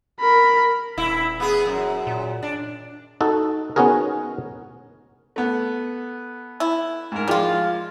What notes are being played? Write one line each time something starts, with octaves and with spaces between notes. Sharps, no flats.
A#4 B5
D#1 E4
B3 G#4
F#2
A#2
D4
D#4 F#4 A4
B3 C#4 D#4 F#4 G#4 A#4
A3 B3
E4
G#2 A#4
F3 G3 G#3 F4